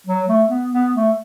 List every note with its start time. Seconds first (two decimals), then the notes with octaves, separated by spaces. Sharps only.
0.07 F#3
0.28 A3
0.50 B3
0.72 B3
0.94 A3